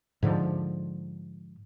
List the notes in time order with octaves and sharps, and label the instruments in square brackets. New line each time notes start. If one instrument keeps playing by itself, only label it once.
[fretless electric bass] G#2 D3 F3